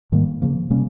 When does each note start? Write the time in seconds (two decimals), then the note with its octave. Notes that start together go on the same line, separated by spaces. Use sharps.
0.12 G#2 D#3 G3 A#3
0.42 C#3 F3 A#3
0.70 C3 G3 A#3 C#4